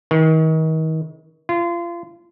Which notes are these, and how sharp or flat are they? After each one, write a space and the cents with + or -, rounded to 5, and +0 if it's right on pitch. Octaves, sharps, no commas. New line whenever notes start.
D#3 +35
F4 -30